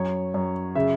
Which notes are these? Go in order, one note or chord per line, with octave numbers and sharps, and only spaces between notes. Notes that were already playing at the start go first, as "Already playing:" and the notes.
Already playing: F#2 C#5
F#2
C#3 E5